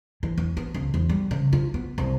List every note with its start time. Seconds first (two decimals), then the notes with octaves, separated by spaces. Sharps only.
0.23 E3
0.38 E2
0.57 B3
0.74 C#2
0.94 E2
1.09 G3
1.31 C#3
1.53 F4
1.74 B3
1.98 C2